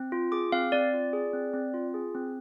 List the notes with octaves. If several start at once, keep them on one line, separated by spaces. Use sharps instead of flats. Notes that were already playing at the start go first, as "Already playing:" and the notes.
Already playing: C4
F4
G#4 D6
C4 F5
C4 D5
F4
G#4
C4
C4
F4
G#4
C4